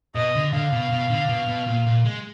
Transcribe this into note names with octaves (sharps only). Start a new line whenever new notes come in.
B2 D#5
D3
D3 F5
B2
B2
D3
B2
B2
A#2
A#2
G#3